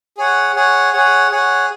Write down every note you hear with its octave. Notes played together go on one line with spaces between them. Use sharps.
G#4 C#5 F#5
G#4 C#5 F#5
G#4 C#5 F#5
G#4 C#5 F#5